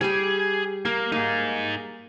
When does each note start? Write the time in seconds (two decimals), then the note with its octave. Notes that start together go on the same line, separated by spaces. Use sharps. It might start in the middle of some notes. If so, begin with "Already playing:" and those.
0.01 G3 G4 G#4 G#5
0.85 A#3 A#4
1.12 A#3 D#4 G#4